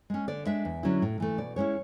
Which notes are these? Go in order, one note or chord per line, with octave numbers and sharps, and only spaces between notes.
G#3 C#4
D3 D5
G#3 D4 E5
E2
D3 F#3 C#4 E4
A2
E3 A3
B2 D5
G#3 C#4 E4 C#5